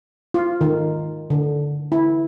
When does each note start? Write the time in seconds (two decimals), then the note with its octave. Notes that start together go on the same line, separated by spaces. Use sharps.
0.34 F4
0.61 D#3
1.30 D3
1.92 E4